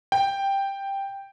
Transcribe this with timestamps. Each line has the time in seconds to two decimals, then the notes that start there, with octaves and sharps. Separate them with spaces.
0.12 G5